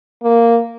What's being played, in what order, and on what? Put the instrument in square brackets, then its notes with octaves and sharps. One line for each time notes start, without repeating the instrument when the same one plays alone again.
[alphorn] A#3